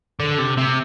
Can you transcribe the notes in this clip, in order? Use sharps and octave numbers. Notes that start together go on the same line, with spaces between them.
D3
C3
C3